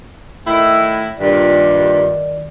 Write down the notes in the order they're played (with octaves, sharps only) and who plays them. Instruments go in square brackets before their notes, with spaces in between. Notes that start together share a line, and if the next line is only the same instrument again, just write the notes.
[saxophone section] A2 D#3 E4
[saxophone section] G2 A#2 [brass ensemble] D#3 D5